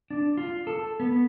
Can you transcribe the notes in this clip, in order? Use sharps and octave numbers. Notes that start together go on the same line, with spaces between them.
D4
F4
A4
B3